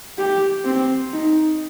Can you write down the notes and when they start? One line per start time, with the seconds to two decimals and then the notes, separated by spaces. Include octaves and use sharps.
0.18 G4
0.65 C4
1.13 D#4